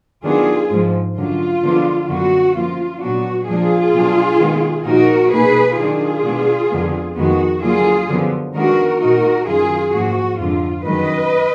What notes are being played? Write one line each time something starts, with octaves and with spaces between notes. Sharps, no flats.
D#3 F#3 B3 D4 F4 G#4
G#2 F3 G#3
F#2 D3 F#3 F4
D3 F3 G#3 B3 D4
F#2 D3 F#3 B3 F#4
F#2 F3 A#3 F4
A#2 F#3 B3 D4 F#4
A#2 F3 G#3 D4 F4 G#4
B2 F#3 D4
D#3 G#3 B3
A#2 F3 A#3 D#4 F#4 A#4
B2 A#3 D#4 G#4 B4
D#3 F#3 D4 F4 G#4
B2 G#3 B3 D4
F2 D3 G#3 B3
F2 D#3 G#3 B3 F#4
D3 F#3 A#3 F4 G#4
F#2 D3 F3 B3
D#3 G#3 B3 D4 F#4 A#4
A#2 G#3 D#4 F#4 A#4
F#2 D#3 F#3 F4 G#4
G#2 F3 A#3 F#4
F2 D3 G#3 F4
F#2 D#3 G#3 B4 D#5